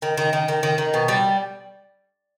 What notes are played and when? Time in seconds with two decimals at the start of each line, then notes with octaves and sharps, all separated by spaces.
0.02 D#3
0.17 D#3
0.33 D#3
0.48 D#3
0.63 D#3
0.78 D#3
0.94 B2
1.08 G3